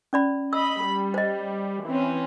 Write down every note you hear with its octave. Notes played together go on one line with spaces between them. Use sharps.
C#4 D5 B5
D#5 B5 E6
G3
C5 D#5
E3 C4 C#4